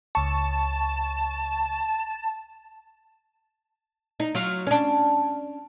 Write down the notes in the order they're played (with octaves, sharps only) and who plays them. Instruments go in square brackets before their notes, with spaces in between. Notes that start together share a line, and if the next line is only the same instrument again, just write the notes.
[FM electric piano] C#2 C#6 [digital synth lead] A5
[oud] D#4
F#3 F4
C#4 D4